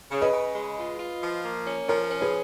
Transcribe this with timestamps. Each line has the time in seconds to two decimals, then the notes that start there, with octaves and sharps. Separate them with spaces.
0.11 C#3
0.22 B4 D#5
0.32 C#3
0.55 G#3
0.78 F4
0.99 F4
1.22 F3
1.44 A#3
1.66 C#4
1.88 F3 A#4 C#5
2.10 C#4
2.21 G#4 B4